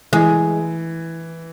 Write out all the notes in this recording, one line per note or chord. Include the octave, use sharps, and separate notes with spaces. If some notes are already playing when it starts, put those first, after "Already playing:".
E3 G#3